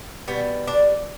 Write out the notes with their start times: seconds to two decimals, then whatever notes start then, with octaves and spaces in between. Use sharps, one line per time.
0.28 B2 G3 B3
0.67 D4